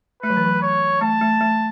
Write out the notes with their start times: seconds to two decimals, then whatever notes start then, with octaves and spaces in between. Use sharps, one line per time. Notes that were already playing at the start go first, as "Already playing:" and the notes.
0.22 A3 B4
0.30 F#3
0.37 E3
0.44 F#3
0.62 C#5
1.01 A3 A5
1.21 A3
1.41 A3